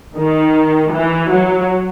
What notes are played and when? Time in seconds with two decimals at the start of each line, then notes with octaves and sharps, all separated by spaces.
0.17 D#3
0.92 E3
1.31 F#3